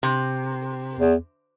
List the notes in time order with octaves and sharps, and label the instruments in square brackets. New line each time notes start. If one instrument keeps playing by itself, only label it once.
[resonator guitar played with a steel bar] C3
[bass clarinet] E2